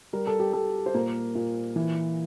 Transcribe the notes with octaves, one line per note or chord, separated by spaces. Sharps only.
G3 A#4
A4
G4
G3 A4
C5
A#2 A#3 A#4
A#2
E3